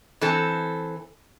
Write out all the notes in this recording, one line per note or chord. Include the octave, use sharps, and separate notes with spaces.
E3 C4 A4